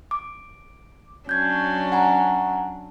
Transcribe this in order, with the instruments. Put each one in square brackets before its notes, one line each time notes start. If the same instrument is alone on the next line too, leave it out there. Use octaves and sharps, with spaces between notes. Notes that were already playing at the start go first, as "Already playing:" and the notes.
[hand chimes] D6
[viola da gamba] F#3 C#4 D4 [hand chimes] G6 G#6
[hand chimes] F#5 G#5 A#5